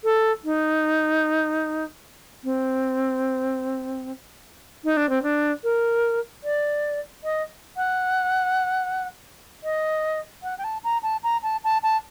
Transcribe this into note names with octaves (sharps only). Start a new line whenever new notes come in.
A4
D#4
C4
D#4
D4
C4
D4
A#4
D5
D#5
F#5
D#5
F#5
G5
A5
A#5
A5
A#5
A5
A5
A5